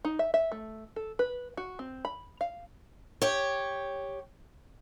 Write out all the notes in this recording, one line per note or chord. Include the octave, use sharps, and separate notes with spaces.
D#4
E5
E5
A3
A4
B4
F#4
C4
B5
F5
G4 C#5